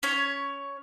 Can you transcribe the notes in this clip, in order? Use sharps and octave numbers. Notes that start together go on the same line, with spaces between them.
C#4 C#5